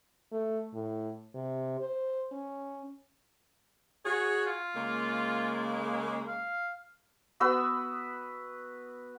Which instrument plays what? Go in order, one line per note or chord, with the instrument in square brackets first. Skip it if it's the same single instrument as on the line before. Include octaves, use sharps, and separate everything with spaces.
[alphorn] A3
A2
C3
C5
C#4
[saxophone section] F#4 G#4 [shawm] C#5
[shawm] F4
[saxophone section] C#3 G#3 A#3
[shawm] F5
[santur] B3 F#4 B4 E6